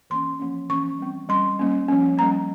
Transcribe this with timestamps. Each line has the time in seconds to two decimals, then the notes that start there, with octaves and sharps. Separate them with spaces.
0.10 E3 A#3 C#4 C6
0.40 F3 A#3 C#4
0.69 E3 A#3 C#4 C#6
0.99 G3 C4
1.29 G3 C#4 C6
1.59 G3 A#3 C#4
1.88 F3 A#3 C#4
2.17 G3 A#3 C#4 A#5